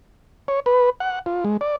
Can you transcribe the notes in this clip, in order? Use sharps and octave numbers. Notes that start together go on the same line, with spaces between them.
C#5
B4
F#5
F4
G#3
D5